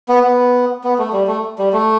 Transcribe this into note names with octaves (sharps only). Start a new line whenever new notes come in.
B3
B3
B3
A3
G3
A3
G3
A3